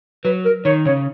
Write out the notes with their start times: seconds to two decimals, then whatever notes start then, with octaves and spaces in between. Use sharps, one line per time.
0.25 F#3 B4
0.45 A#4
0.65 D#3 C#5
0.86 C#3 C#5